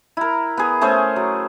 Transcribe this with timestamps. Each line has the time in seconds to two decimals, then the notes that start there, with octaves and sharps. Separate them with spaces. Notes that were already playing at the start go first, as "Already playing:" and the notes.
0.17 E4 A#4
0.57 B3 G#4
0.81 A3 C#4 G#4 C5
1.16 F#3